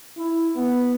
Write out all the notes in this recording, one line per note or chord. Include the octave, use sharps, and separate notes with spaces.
E4
B3